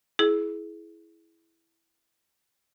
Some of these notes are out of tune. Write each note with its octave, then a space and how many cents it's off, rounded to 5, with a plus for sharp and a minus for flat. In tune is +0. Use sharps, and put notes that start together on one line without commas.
E4 +0 G#4 +25